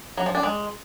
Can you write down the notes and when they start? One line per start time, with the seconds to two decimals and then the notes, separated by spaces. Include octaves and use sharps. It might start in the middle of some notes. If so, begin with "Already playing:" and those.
0.17 F#3
0.26 F3
0.35 D4
0.43 G#3